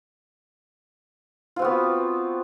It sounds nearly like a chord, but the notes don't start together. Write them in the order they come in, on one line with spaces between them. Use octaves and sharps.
F4 C4 F#4 B3